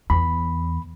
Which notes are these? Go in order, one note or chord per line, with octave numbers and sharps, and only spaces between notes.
E2 B5